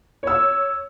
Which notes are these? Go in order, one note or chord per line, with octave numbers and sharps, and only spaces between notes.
C#5 E6